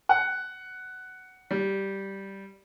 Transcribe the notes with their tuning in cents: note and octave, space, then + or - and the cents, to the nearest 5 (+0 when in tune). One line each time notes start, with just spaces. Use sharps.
F#5 +10
G3 -5